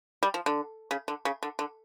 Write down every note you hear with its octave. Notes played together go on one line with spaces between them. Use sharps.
G3
F3
D3
C#3
D3
C#3
D3
D3